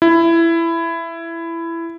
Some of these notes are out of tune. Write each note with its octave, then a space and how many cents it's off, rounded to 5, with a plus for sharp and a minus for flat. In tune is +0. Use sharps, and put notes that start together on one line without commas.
E4 +15